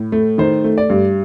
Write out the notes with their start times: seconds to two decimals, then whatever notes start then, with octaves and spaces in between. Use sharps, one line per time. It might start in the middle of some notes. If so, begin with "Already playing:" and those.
Already playing: A2
0.12 A3
0.38 D#3 C5
0.64 A3
0.78 D5
0.90 G2